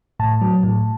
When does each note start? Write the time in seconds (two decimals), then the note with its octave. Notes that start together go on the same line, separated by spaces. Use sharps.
0.19 A2 A5
0.41 F#3
0.63 A2